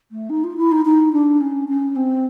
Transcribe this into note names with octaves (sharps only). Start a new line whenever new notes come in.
A3
D#4
F4
E4
D#4
D#4
D4
C#4
C#4
C4